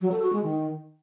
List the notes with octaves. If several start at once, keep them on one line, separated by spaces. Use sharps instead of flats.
F#3
A4
F#4
G#3
D#3